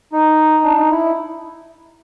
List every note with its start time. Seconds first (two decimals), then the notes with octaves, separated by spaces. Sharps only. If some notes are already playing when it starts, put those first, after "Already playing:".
0.13 D#4
0.63 D4
0.77 D#4
0.90 E4